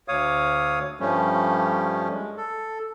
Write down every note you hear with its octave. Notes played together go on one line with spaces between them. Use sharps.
D2 C#5 F5 D#6
G2 F3 G3 A3 C#4
G#3
A4